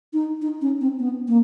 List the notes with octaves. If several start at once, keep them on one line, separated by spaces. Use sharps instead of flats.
D#4
D#4
C#4
C4
B3
A#3